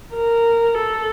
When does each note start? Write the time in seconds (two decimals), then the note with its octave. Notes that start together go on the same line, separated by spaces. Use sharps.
0.13 A#4
0.77 A4